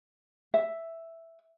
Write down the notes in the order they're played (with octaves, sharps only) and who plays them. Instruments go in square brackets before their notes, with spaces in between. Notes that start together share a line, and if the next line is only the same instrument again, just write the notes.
[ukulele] E5